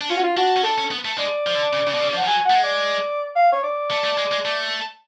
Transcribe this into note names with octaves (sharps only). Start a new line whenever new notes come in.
D4
C#4 F4
F#4
F4
D4 F#4
C#4
D4 A4
C#4
B3
A3
G#3 D5
F3
D3
C#3
C#3
B2
C#3
F3
F#5
F3
F#3 G#5
A3 F#5
G#3
D5
F5
C#5
D5
A3
A3
G#3
G#3
A3